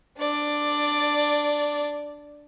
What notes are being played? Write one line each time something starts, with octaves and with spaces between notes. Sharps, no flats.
D4 D5